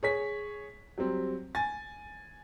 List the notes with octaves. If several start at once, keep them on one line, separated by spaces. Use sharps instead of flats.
G#4 C#5 B6
F#3 G3 C4
G#5 A6